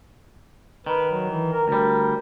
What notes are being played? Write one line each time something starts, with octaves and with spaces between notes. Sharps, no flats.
D#3 B4
F#3
E3
A#4
D2 G3 A#4